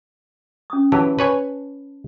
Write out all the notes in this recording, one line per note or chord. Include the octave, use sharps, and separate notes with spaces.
C#4 D#6
E3 F#3 G4 A5 B5
B4 C#5 G#5